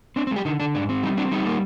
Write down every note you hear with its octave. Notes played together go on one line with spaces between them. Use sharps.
C4 D4
C4
G#3 G4
D3 D#4
D3 D4
G#2 D4
C4
G3 D#4
C4 D4
G3 D#4
A#3